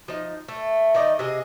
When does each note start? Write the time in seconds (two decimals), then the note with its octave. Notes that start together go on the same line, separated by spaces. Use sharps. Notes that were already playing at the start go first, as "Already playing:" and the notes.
0.08 F3 D#4
0.48 A3
0.94 D#3 D#4 D5 D#5
1.19 C3 G#4 D#5